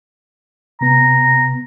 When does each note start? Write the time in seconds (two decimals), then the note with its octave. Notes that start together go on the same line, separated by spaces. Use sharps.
0.81 C3 B3 A#5